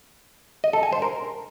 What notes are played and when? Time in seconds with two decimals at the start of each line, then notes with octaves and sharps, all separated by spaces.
0.64 D#5
0.73 A4
0.83 G#5
0.93 C5
1.02 A#4